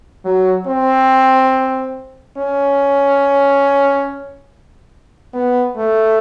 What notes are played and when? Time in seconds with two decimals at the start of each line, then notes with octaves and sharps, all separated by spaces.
0.25 F#3
0.67 C4
2.37 C#4
5.34 B3
5.77 A3